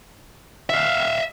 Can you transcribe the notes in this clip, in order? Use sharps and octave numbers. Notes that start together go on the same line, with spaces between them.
E5 F5